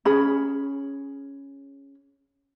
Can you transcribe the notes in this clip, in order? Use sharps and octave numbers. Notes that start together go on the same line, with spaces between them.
C#4 G#4 B5